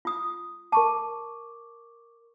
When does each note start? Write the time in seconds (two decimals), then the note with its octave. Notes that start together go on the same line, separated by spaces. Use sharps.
0.05 F4 D#6
0.72 A#4 A5 C#6 D6